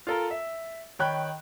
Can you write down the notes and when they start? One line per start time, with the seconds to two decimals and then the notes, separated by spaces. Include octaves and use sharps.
0.07 F4 A4 A#4
0.30 E5
0.99 D#3 C#5 G5 B5 F#6